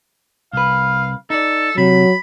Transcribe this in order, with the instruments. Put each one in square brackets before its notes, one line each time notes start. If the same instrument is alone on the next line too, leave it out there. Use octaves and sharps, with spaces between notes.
[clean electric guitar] C2 B4 [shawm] F5
[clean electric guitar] D#4 D5 [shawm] A4
[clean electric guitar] C3 [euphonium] F#3 [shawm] B5